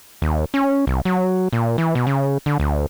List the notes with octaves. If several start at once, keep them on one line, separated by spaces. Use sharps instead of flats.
D#2
C#4
C2
F#3
A#2
E3
B2
C#3
D3
D2